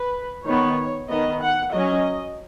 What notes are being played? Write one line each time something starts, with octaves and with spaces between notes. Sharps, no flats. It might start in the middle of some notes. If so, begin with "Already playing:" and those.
Already playing: B4
D#3 B3 C#5
D#3 B3 D#5
F#5
F#3 C#4 D#5